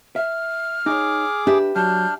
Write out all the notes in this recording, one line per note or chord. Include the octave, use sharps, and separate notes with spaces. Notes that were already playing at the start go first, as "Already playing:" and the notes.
E5 F6
D#4 G#4 C#5 D6
D4 G4 B4 E5
F#3 D4 F6 G6